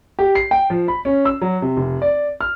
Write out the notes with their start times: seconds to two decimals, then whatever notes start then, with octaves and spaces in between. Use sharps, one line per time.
0.19 G4
0.35 C7
0.51 G5
0.70 F3
0.88 B5
1.05 C#4
1.25 E6
1.41 F#3
1.62 C3
1.77 F1
2.02 D5
2.41 F6